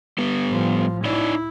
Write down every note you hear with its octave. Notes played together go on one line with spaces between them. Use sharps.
G3 B3
A2 F3
D#4 E4 C#5 D5